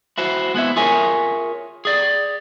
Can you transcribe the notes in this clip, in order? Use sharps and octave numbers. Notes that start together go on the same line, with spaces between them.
E4 F#4 C5
G#3 B3 E4 E5
F4 G#4 A#4 C#5 E5 G#5
G#4 D5